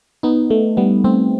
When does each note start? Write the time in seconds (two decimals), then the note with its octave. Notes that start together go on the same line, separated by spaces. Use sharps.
0.23 B3 D#4
0.50 A3
0.77 G3 B3
1.04 A3 C4